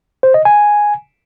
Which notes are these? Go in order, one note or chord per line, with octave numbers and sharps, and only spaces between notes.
C5
D#5
G#5